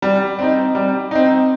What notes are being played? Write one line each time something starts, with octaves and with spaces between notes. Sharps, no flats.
G3
C4 D#4
G3
C4 D#4